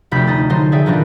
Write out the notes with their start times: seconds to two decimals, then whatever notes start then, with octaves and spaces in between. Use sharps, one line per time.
0.11 F1 D2 C3 B5 G6 B6
0.27 D#4 A5 A6
0.50 D3 F#3 D#4 C5
0.72 G#4 D5 E5 G5
0.86 A#2 D3 E3 F#3 D4 D#4